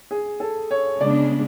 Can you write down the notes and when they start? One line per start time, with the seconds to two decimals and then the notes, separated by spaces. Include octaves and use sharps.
0.11 G#4
0.40 A4
0.71 C#5
1.00 C#3 G#3 B3 D4 D5